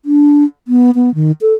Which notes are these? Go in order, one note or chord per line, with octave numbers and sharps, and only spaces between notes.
D4
B3
B3
D#3
A4